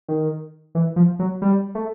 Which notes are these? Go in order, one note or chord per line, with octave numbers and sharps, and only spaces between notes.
D#3
E3
F3
F#3
G3
A3